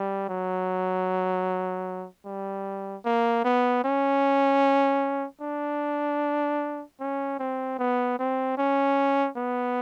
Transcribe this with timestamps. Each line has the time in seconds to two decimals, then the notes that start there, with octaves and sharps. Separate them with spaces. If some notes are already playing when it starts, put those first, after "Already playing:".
Already playing: G3
0.29 F#3
2.26 G3
3.05 A#3
3.45 B3
3.84 C#4
5.42 D4
7.00 C#4
7.39 C4
7.78 B3
8.19 C4
8.57 C#4
9.36 B3